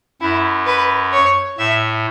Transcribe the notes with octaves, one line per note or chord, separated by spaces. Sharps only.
F#2 E4
B4
C#5
A2 E5